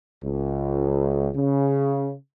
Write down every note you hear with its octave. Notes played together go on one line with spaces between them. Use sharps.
C#2
C#3